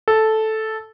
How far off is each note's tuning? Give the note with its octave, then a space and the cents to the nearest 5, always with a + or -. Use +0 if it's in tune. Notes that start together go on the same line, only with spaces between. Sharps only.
A4 -5